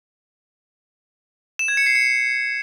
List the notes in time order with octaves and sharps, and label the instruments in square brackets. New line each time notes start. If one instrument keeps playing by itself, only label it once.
[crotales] E7
G#6
C#7
C7
C#7